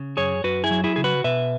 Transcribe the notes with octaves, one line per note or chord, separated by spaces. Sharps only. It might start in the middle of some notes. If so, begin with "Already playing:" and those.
Already playing: C#3
F#2 G#4 C#5
F#2 F#4 B4
E4 G#4
F#3
E4 G#4
C#3 G#4
F#4 B4
B2 B4 E5